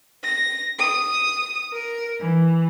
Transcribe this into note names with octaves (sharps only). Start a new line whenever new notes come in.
A#6
D#6
A#4
E3